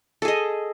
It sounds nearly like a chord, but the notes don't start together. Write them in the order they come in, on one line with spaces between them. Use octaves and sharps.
A4 G#4 D#5